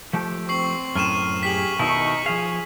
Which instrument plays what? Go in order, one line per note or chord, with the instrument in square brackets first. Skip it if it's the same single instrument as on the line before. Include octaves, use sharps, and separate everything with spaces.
[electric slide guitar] F3 A3 G4
[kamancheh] C4 [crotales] C#6 C7 F#7
[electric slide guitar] F#2 A2 [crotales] F6 D#7 E7
[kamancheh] G4 G#4 [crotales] B6 F#7
[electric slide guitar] B2 D#3 E4 [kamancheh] D#4 C#6
[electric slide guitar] F3 F5 [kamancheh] G#4